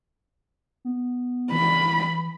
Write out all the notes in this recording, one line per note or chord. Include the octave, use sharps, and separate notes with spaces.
B3
E3 B5